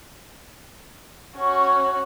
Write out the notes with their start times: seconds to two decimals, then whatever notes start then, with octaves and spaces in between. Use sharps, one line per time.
1.36 C#4 F#4